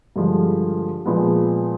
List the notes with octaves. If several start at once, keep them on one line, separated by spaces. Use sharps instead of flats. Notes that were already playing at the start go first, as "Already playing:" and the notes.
G2 D3 F3 G#3
A#2 F3 G#3 B3